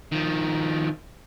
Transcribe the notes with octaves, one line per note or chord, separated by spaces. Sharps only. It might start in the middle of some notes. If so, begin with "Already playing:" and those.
D#3 F3